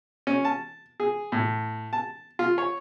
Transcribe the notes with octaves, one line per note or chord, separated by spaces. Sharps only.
C#4
A5
G#4
A2
A5
F4
C#5